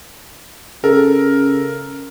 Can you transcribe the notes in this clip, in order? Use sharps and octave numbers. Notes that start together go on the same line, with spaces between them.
C#3 A4 A#4